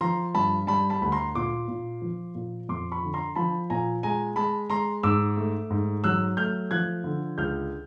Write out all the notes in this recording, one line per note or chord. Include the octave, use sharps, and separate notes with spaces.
F3 A#5 C6
G2 A5 B5
G3 A5 B5
A5 B5
D2 B5
A#5 C6
A#2 C6 D6
A#2
F3
A#2
F2 C6 D6
B5 C#6
D3
A#5 C6
F3 A5 B5
A#2 G#5 A#5
G#3 G#5 A#5
G#3 A5 B5
G#3 A#5 C6
G#2 D6 E6
A3
G#2
F#3 E6 F#6
A3 F6 G6
F3 F#6 G#6
D3
C#2 F6 G6